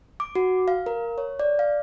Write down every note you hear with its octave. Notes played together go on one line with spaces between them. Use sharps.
D6
F#4
F5
A#4
C#5
D5
F5